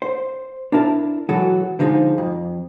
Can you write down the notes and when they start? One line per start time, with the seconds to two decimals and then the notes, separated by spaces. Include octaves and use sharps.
0.02 C5
0.72 D4 E4 A#4 A5
1.29 E3 F#3 G#3 F#4 A4
1.79 D3 F3 G#3 D#4
2.18 F2